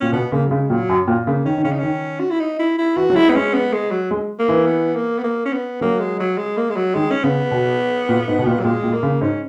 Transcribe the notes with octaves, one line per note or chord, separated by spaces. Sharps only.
A#2 C#4
B2 B3
C#3 A#3
F#3
C#3 G#3
A#2 F#3
F#2
A#2
C#3 A#3
D#3 C#4
D#3
C#3 C#4
D#4
D#3 C#4
F#4
E4
D#4
E4
E4
E3 F#4
F#3
G#3 E4
B3
G#3 C#4
B3
G#3
F#3
G#3
A#3
E3
B3
A#3
B3
A#3
C#4
B3
F#3 A#3
G#3
F#3
G#3
A#3
G#3
F#3
D#3 G#3
C#4
C#3 B3
B2
A#2
G#2
B2
A#2
F#3
A#2 G#3
A#2
A#3
C#3
G#2 C#4